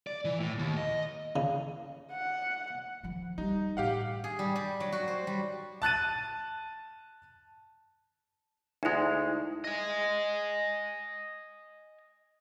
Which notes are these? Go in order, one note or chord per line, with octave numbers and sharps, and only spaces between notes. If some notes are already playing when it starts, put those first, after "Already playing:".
D5
E3
A2
D#2
D#5
C#3
F#5
D#3 F3
G3 D#4
A2 E3 G4 F5 F#5
G#4
G3
G3
F#3
F#4
C5
G3
A5 F#6 A6 D#7
D2 G#3 D#4 E4
D#5 G#5